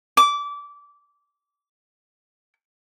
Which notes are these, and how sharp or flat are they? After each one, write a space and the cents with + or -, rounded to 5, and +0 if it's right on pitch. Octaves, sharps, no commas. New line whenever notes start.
D6 -20